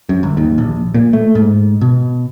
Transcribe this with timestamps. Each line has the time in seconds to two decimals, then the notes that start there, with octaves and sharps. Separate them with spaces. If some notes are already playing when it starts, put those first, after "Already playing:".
0.09 F#2
0.23 G1
0.37 D#2
0.58 A#1
0.94 A#2
1.13 A3
1.35 G#2
1.81 B2